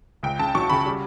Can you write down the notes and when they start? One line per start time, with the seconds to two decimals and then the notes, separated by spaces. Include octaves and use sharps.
0.23 C#2 G5
0.39 C#3 A5
0.55 F#3 C#6
0.70 C#3 B5
0.86 G3